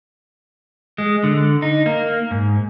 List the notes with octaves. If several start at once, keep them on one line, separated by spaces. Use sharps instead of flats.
G#3
D3
D#4
A#3
G#2